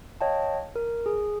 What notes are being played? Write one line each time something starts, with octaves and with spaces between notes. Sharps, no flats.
C#5 D#5 F5 G5 A5
A#4
G#4